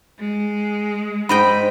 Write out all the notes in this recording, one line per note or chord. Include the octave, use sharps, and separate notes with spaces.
G#3
G#2 D#5 G5 B5